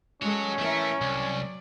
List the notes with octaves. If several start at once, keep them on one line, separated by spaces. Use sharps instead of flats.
G#3 C#4 F#4 A4 C#5
E3 A3 A#4 E5
C2 F#3 D5